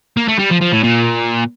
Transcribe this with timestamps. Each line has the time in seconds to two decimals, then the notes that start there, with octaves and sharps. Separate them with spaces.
0.17 A#3
0.28 A3
0.39 G3
0.50 F3
0.61 F3
0.72 A2
0.83 A#2